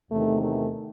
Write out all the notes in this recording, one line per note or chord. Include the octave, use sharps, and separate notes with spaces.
E2 C3 D#3 A3
A3